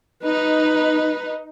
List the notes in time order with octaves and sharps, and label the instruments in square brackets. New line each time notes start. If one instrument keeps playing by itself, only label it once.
[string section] D#4 [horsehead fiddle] B4